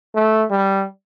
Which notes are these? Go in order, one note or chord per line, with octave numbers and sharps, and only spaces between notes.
A3
G3